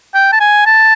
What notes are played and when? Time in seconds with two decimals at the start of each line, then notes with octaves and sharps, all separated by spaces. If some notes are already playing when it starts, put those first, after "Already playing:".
0.14 G5
0.33 A5
0.40 G#5
0.66 A5